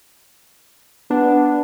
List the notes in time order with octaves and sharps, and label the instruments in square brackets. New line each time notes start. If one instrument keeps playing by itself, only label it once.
[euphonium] B3 [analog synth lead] D4